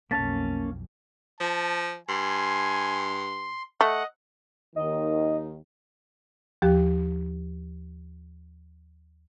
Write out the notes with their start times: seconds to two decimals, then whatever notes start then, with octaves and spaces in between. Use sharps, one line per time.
0.11 B1 F2 A#3 C#4 F5 A5 A6 B6
1.40 F3 A5
2.09 G2 G#5 C6
3.81 A3 D#5 F#5
4.76 D#2 D#3 D#5
6.62 D#2 F3 G4